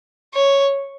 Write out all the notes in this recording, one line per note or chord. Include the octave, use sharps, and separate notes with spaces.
C#5